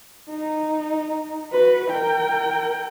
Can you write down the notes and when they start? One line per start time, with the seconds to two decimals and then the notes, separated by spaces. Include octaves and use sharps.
0.30 D#4
1.52 F#4 B4
1.90 A#4 G5